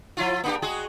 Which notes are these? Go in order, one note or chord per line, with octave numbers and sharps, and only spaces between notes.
F3 E4 F4
A#3 D4 G4
G#3 F#4 G#4